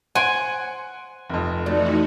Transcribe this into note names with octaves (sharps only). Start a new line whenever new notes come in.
C5 C#5 F#5 G#5 C6 D7
F1 F2
E3 A3 D#4 F#4 A4 D5